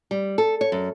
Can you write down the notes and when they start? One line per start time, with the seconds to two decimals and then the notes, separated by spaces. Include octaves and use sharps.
0.11 G3
0.38 A4
0.61 C#5
0.72 F#2